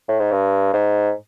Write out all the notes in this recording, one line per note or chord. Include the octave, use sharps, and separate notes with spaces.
A2
G#2
G2
G#2